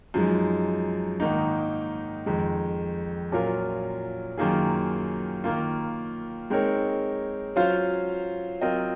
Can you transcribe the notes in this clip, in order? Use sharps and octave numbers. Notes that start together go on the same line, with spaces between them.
F#2 F3 G#3 D#4
G#2 D#3 A#3 D#4
F2 D#3 G#3
A#2 F#3 C#4 F4 A#4
F#2 D#3 A#3 F4 G#4
D#3 A#3 F4
G#3 C4 D#4 A#4 C#5
F#3 C#4 F4 C5 F5
F#3 C4 F4 A#4 D#5